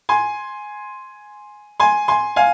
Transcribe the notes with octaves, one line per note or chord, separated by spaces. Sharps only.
G#5 C6
G#5 C6
G#5 C6
F5 G#5